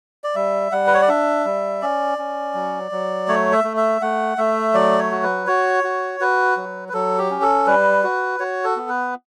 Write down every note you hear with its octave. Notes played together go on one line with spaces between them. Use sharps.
D5
G3 E5
G3 F#5
B4
C#5
D5
D4 E5
G3
C#4 D5
C#4
F#3
F#3
A3 C#5
E5
A3
E5
A3 F#5
A3 E5
F#3 D5
C#5
F#4
B4
F#4 C#5
F#4
F#4 B4
F#3
B4
F#3 A4
G4
C#4
A4
G3 B4
F#4
F#4 C#5
A4
B3
B4